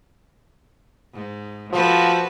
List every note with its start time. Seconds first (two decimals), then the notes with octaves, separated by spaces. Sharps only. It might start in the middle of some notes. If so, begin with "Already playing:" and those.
1.13 G#2
1.73 F3 F#4 A4 B4